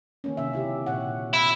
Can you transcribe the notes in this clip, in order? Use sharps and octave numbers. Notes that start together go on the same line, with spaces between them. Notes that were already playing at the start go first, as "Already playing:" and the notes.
D#3 A#3 C#4
C3 E5
C#3 E4 G4
A#2 C#5 F#5
E4